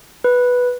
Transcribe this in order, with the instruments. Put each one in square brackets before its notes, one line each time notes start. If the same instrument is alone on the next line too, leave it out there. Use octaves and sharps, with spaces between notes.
[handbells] B4